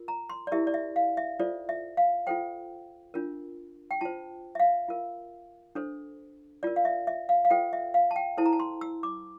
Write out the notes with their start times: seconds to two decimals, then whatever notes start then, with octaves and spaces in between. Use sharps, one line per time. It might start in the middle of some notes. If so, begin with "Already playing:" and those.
Already playing: F4 A#4
0.08 A#5
0.30 C6
0.47 D5
0.52 E4 G4 A#4 E5
0.67 D5
0.74 E5
0.96 F5
1.17 E5
1.39 F4 A4 C5 D5
1.69 E5
1.97 F5
2.27 F4 A4 C5 G5
3.14 D4 F4 A#4
3.91 G5
4.01 F4 C5 A5
4.55 E5
4.60 F5
4.88 F4 A#4
5.75 D4 A4 C5
6.63 F4 A#4 D5
6.76 F5
6.85 E5
7.07 E5
7.29 F5
7.45 F5
7.50 F4 A4 C5 G5
7.73 E5
7.94 F5
8.11 A5
8.16 G5
8.38 E4 A4 C5 A5
8.46 A#5
8.53 A5
8.60 C6
8.81 E6
9.03 D6